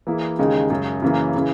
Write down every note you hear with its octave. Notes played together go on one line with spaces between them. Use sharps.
E3 A#3 E4 G#4
D#2 C#3 G#3 D#4
F#2 C#3 G#3
F#2 C#3 E3 A#3
C#3 E3